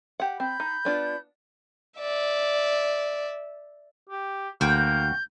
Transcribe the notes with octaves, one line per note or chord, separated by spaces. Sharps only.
G4 F#5
C4 B5 G6
D#4
B3 D4 F4
D5 E5
G4
D2 A#3 F#4 G5 G6